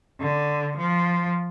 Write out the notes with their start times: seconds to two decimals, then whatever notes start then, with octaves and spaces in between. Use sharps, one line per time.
0.20 D3
0.77 F3